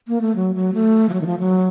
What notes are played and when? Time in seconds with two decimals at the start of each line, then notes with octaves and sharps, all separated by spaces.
0.08 A#3
0.21 A3
0.36 F#3
0.55 F#3
0.74 A3
1.09 F3
1.13 F#3
1.21 D#3
1.26 F3
1.39 F#3